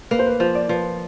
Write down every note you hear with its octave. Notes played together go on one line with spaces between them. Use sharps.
A#3 B4
C5
B4
F3 C5
D5
F3 B4